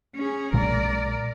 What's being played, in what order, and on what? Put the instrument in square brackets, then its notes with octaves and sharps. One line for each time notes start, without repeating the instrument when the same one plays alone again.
[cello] C#4 G#4
[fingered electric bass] B1 A#2 G#3 [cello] A#4 D5